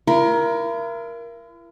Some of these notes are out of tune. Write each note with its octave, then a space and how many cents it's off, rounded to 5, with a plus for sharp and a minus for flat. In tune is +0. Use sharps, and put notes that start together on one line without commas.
E4 +45 A#4 +15